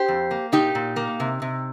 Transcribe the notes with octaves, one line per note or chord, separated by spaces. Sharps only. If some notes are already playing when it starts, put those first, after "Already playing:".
Already playing: G4 C5
F2
A#3
A#2 D#4 G4
A#2
A#3
C3
C3